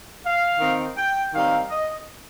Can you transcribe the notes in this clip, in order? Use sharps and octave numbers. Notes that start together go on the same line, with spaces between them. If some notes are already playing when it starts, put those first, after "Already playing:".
F5
D#3 C4 D#4
G5
D#3 G3 C4 D#4 F5
D#5